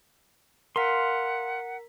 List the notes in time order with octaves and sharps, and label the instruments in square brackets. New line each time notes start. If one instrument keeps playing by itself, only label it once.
[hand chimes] A#4 A#5 B6 [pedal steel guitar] F5 C6 [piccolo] F#5